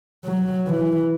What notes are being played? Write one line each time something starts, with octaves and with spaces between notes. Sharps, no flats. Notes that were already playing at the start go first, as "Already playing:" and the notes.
F#3
E3